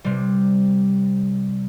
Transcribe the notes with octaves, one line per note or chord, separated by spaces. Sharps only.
C3 G3